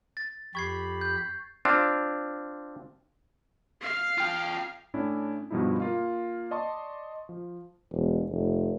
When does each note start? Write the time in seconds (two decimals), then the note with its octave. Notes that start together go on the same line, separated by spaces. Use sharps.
0.17 A6
0.55 F2 G4 B5 C#6 G#6 C7
1.01 G6
1.65 C4 D4 F4
3.81 F5
4.18 F4 G5
4.94 A2 C#4 D4 E4
5.51 G2 B2 F3 G3 D#4 E4
5.80 A#3 F4 F5
6.51 D5 D#5 A5 C6 C#6
7.29 F3
7.91 E1
8.30 F1